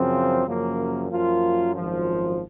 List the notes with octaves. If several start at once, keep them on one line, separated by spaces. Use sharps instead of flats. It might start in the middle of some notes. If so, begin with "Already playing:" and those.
Already playing: F#2 C#3 F3 C4
F#2 C#3 F3 A#3
F#2 F3 A#3 F4
G#1 F#2 F3